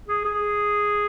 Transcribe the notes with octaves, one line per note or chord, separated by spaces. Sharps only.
G#4
G#4